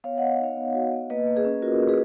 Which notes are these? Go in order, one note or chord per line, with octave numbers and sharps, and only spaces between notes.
B3 C#5 F5
B3 D#5 F#5
D#4 C#5 F5
B3
F#4
B3
A#3 B4 D#5
A#3
G#4 B4
C#4
F4 F#4 A#4
C#4
G#4 B4